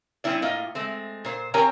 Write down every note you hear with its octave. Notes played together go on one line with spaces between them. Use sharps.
G3 C4 C#4 E4 D5
A2 A#3 F4 D#5
G#3 A3 C4
A#2 C5
C4 G4 A#4 C#5 G#5 A#5